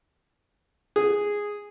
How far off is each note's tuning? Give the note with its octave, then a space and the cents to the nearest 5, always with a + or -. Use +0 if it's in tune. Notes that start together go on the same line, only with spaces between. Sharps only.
G#4 -5